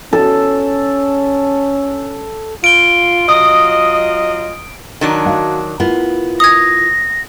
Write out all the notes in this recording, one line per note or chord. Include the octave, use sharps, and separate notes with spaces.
C#4 A4
F4 D7 G7
F#3 F4 D#5 D#6
D#3 F#3 D4
F#4 D#5 F5
B3 E4 F4 A#4
D#6 G#6 A#6